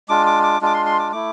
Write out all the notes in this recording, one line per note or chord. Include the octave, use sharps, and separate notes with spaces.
G#3 D4 F4 D6
D6
D6
G#3 D4 F4 D6
C6
C6
D6
A3 E4 D6